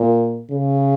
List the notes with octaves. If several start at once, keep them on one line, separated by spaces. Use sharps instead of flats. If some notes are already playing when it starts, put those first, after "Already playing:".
Already playing: A#2
C#3